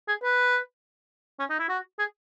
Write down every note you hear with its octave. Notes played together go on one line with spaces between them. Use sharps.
G#4
B4
C#4
D#4
E4
F#4
G#4